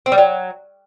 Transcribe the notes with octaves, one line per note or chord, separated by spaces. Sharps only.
C4
G3
F#3